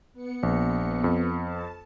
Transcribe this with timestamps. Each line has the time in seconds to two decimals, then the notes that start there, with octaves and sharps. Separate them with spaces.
0.14 B3 C#7
0.43 A#1
1.04 F2
1.45 A5